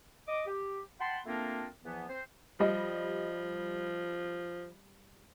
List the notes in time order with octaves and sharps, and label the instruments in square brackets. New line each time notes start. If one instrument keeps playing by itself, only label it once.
[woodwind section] D#5 D6
G4
F#5 G5 A5 B5 C6
A3 A#3 C4 D4 F4 A#4
E2 E3 F3 B3
C4 C5
[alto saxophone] F3 [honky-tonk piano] G3 D#5